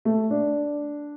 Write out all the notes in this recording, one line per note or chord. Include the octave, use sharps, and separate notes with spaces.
A3
D4